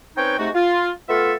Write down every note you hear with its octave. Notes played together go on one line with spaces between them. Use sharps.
C4 C#4 D#4 B4 C#5 G5
C3 G#3 A3 D#4 F#4
F4
A3 B3 F4 A4 E5 F5